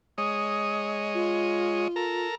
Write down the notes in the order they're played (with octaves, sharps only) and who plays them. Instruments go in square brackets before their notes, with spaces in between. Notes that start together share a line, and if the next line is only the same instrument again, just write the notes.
[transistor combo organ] G#3 C#5 D#5 [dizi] D#6
[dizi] F4
[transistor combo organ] A4 A#4 A#5